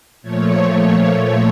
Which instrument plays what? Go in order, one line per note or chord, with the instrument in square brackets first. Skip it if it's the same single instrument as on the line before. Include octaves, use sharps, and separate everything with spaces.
[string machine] A#2 F3 A3 C#5